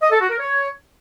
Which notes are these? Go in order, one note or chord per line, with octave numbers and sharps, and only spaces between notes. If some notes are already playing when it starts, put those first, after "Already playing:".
D#5
A4
F#4
A#4
C#5